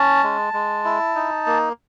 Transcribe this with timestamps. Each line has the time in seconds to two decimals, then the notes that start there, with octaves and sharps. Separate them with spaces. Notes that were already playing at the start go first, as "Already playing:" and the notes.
Already playing: C#4 A5
0.24 G#3
0.53 G#3
0.85 E4
1.15 D#4
1.46 A#3